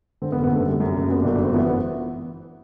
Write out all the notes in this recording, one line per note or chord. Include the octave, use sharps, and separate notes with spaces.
D3 C4
B3
F#1
B3
D3 A3
G3 A3
F#2
F#1
F#2 B3
D4
G1
D4
F#2 C4
E3 B3
B3